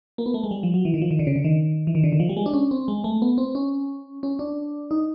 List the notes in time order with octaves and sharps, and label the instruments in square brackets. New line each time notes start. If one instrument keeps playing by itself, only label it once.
[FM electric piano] A#3
B3
A3
G#3
G3
F3
F#3
E3
D#3
F3
D#3
D3
C#3
D3
D#3
E3
D#3
D3
D#3
F3
G3
G#3
D4
C#4
C4
G#3
A3
B3
C4
C#4
C#4
D4
D#4